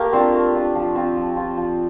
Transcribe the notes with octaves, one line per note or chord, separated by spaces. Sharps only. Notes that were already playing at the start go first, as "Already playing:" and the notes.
Already playing: A3 A#3 G4 A#4
C4 D4 F4 C5
A3
D4 F4
F3
C4 F4
F3
C4 F4
F3